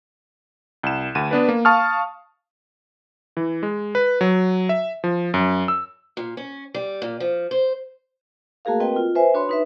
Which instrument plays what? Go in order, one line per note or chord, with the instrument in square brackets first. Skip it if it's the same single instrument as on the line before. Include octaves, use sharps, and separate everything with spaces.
[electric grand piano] C2 E7
D2 D#7
B3 D4 B4
A#3
F5 A5 C#6 D#6 F6
E3
G#3
B4
F#3
E5
F3
F#2
E6
[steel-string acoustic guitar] A#2
C#4
G3
A#2
F3
C5
[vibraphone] A3 A#3 F#4 G#4 A#4 F5
C4 F#4 A#4 B4 D#5 G5
F4
B4 C5 E5 G#5
D4 F#4 B4 C#5 B5 C6
D#4 B4 E5